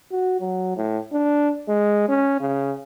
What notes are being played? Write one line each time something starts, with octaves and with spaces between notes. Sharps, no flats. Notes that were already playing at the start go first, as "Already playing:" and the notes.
F#4
F#3
A2
D4
G#3
C#4
C#3